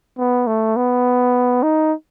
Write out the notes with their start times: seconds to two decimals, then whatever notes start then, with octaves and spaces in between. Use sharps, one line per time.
0.19 B3
0.47 A3
0.77 B3
1.63 D#4